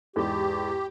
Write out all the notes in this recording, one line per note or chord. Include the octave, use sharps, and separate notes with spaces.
E2 G#2 G#3 G4